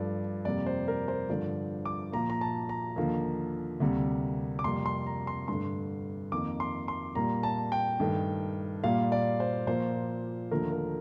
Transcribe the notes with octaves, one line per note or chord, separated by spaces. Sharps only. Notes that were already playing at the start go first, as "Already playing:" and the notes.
Already playing: G2 F3 A3 D5
F2 C3 G3 A#3 D5
C5
A#4
C5
G2 D3 F3 D5
D6
A#2 F3 A#3 A#5
A#5
A5
A#5
D#2 D3 F3 A#3
D2 C3 G3 A#3
D6
F2 C3 G3 A#3 C6
C6
A#5
C6
G2 D3 A3 C6
F2 D#3 A#3 D6
C6
C6
A#2 G3 A#3 A#5
A5
G5
G2 D#3 A3
A#2 G3 A#3 F5
D5
C5
A#2 F3 A#3 C5
D#2 D3 F3 A3 A#4
A#4